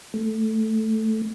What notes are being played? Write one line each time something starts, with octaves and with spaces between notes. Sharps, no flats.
A3